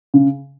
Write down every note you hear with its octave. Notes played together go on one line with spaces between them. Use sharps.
C#3